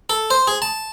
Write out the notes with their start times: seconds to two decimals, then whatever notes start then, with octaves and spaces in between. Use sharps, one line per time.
0.10 A4
0.30 C5
0.47 G#4
0.62 A5